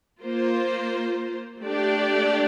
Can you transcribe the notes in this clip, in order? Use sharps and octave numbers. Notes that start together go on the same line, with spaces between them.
A#3 F4 C5
A3 D4 G4 D5